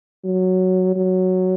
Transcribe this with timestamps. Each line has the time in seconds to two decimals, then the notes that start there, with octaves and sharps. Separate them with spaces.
0.25 F#3
0.96 F#3